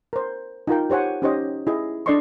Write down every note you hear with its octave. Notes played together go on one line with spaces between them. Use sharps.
A#4 C5
D#4 F4 A#4 G5
G4 C5 C#5 F#5 G#5
C#4 D#4 G4 C5 C#5 D#5
E4 G#4 D#5
D4 A4 D5 D#5 C6 C#6